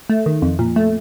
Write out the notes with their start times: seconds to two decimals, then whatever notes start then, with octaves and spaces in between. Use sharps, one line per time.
0.10 A3
0.26 D#3
0.42 F2
0.59 A#2
0.76 A3